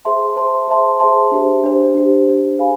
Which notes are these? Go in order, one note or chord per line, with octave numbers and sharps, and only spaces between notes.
G#4 C5 E5 A5 C6
G#4 C5 E5 A5 C6
G#4 C5 E5 A5 C6
G#4 C5 E5 A5 C6
D4 G4 C5
D4 G4 C5
D4 G4 C5
D4 G4 C5
G#4 C5 F5 G#5 B5